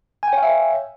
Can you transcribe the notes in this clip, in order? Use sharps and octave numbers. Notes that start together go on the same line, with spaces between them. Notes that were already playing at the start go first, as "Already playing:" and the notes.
C#5 E5 F5 G5 G#5